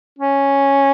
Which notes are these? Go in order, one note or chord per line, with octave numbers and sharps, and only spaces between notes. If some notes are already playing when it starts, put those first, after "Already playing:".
C#4